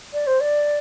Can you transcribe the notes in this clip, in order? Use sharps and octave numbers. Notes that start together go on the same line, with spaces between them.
D5
C5
D5